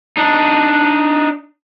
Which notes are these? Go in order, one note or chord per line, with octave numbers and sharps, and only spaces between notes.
D4 D#4